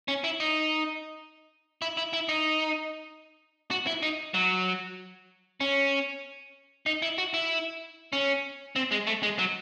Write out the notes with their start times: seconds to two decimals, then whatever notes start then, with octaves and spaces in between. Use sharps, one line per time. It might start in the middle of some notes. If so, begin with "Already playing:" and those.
0.08 C#4
0.24 E4
0.40 D#4
1.82 E4
1.97 E4
2.13 E4
2.29 D#4
3.71 F#4
3.87 E4
4.03 D#4
4.34 F#3
5.61 C#4
6.86 D#4
7.02 E4
7.18 F#4
7.34 E4
8.13 C#4
8.76 C4
8.91 G#3
9.07 A3
9.23 G#3
9.39 F#3